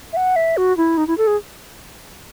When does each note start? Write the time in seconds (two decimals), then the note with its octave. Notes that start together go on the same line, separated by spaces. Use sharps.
0.13 E5
0.17 F#5
0.36 E5
0.57 F#4
0.77 E4
0.97 D#4
1.07 E4
1.18 A4
1.27 G#4